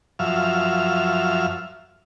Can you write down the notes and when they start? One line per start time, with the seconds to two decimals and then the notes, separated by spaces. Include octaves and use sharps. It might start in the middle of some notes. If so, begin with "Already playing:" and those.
0.19 F#2 F3 E5 F6